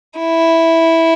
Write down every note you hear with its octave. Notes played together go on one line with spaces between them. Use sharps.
E4